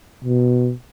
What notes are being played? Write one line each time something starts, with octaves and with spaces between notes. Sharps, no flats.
B2